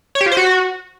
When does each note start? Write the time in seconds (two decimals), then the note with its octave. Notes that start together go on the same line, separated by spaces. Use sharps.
0.15 C#5
0.21 G4
0.26 F4
0.32 C5
0.37 F#4